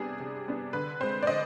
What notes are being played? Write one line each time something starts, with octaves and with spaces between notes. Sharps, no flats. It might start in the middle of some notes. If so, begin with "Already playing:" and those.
Already playing: C3 G3 B3 D4 G#4
C3
G3 B3 D4
D3 B4
G#3 C4 C5
D5
D3 D#5